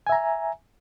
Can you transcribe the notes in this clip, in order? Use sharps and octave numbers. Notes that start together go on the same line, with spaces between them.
E5 G#5 A#5